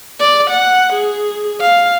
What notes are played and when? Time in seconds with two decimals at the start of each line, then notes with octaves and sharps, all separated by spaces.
0.20 D5
0.51 F#5
0.94 G#4
1.61 F5